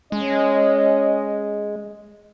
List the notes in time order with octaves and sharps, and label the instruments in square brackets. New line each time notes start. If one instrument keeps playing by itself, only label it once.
[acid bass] G#3 [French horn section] C#4 D#5